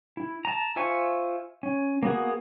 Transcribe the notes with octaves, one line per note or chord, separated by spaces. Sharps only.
E4
A5 A#5
F4 C5 E5 G#5 C#6
C#4
A#3 B3 F#4 G#4